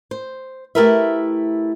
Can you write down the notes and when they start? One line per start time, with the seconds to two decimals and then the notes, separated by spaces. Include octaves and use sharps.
0.11 C5
0.75 A3 E4 G4 A#4 B4 E5